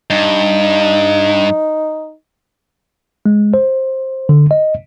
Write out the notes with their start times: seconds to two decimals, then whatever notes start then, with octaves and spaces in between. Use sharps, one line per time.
0.10 G2 D#4
3.26 G#3
3.54 C5
4.29 D3
4.51 D#5